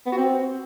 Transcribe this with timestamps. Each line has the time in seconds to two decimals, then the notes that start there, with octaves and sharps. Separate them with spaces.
0.06 B3
0.12 F#4
0.17 C4